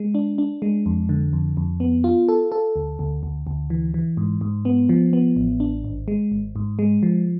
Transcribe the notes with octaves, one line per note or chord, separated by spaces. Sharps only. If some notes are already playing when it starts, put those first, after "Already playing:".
Already playing: G#3
D4
D4
G#3
F2
D3
F2
F2
B3
F4
A4
A4
D2
D2
D2
D2
E3
E3
G#2
G#2
B3
F3
B3
A1
D4
G#1
G#3
G#1
G#2
G#3
F3